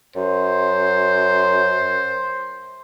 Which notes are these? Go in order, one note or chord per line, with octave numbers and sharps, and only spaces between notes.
F#2 C5